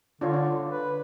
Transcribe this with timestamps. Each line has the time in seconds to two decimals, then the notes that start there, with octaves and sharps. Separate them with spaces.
0.21 D3 D4 F4 C#5
0.34 D4
0.71 B4